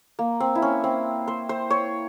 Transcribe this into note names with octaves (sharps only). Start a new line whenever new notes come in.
A#3
C4
E4
C#4
C4
C5
C5
C#5